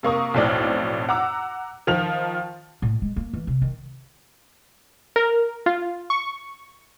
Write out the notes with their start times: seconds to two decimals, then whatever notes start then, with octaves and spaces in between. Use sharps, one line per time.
0.03 C3 A#3 C#6 D#6
0.34 B1 F2 A2 C4 D5
1.09 F#5 A#5 D6 E6
1.87 D#3 F3 F7
2.82 A2
3.02 G#3
3.16 A#3
3.33 E3
3.47 C3
3.62 D#3
5.16 A#4
5.66 F4
6.10 C#6